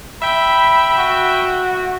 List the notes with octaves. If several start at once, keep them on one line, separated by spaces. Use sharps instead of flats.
E5 G5 B5
F#4